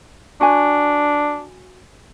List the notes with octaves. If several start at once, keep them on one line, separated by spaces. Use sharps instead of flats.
D4 F#4 G#5